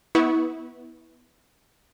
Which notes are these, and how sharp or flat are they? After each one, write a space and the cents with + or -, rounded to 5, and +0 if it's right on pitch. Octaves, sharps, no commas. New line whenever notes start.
B3 +0 E4 -25 C#6 +0